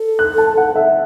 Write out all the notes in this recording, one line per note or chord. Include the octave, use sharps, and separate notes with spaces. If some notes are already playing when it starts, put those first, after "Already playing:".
Already playing: A4
F#6
A5
F#5
E5